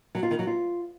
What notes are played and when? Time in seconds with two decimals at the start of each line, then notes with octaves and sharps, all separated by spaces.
0.15 F#3
0.23 F4
0.31 D#3
0.39 F#3
0.47 F4